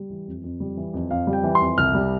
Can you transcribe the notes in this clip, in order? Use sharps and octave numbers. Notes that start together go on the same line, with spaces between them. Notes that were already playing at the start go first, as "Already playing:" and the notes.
Already playing: G3
E3
F2
F2
G3
E3
F2
F2 F5
G3
G5
E3
C6
F2
C2 F6
G3